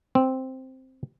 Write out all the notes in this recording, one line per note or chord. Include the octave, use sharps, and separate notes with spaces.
C4